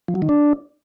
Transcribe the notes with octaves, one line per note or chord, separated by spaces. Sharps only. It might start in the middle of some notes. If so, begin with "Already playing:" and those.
F3
F#3
D#3
D4